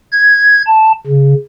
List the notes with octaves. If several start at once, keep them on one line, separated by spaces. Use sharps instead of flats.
G#6
A5
C#3